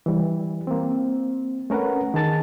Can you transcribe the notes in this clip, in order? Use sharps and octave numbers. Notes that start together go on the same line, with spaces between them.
E3 G3
A#3 C4
A3 C#4 A#4 B4 F#5
D#3 G#4 A5 A6